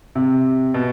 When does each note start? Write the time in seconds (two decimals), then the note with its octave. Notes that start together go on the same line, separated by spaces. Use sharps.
0.15 C3
0.74 B2